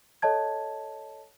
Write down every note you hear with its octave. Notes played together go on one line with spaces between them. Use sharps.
A4 C#5 D#5 A5 G#6